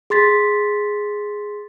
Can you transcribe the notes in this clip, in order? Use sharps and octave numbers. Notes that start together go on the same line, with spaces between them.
G#4 C6 A6 B6